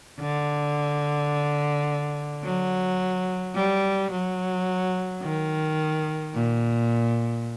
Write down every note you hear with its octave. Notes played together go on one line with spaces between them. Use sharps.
D3
F#3
G3
F#3
D#3
A#2